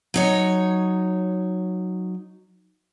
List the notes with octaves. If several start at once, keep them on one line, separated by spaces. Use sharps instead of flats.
F#3 D#4 C#5